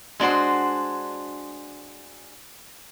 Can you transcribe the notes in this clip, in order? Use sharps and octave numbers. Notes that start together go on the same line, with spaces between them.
G#3 D4 F#4 C5